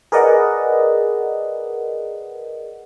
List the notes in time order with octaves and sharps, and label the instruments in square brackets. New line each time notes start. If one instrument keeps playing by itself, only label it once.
[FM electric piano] G#4 A#4 B4 D5 D#5 F#5